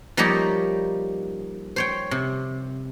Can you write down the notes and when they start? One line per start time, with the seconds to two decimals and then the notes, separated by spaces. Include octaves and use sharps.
0.17 F3 G3 A#3 D#4 G4 C#5
1.76 C5 C#5 G5
2.11 C3